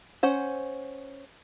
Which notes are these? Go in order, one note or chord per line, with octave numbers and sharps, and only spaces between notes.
C#4 C5 F#5